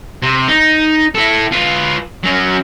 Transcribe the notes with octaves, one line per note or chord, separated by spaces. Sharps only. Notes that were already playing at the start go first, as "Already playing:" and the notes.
C3
D#4
E4 A4
F4 B4
F#3 C#4